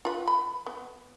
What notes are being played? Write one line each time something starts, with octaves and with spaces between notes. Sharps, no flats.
F4 B4
B5
B3